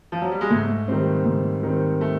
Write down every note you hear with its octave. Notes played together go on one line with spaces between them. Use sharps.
F3
F#3
G3
G#3
G#2 A3
D#3 G3 C4
G#2
D#3 G3 C4
A3